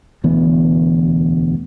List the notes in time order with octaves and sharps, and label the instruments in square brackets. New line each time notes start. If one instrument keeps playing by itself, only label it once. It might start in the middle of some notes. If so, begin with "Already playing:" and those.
[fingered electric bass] E1 D2 E3 B3